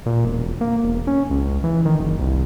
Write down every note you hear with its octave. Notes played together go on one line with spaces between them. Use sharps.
A#2
E1
E1
A#3
E1
C#4
C#2
E3
D#3
F#1
C2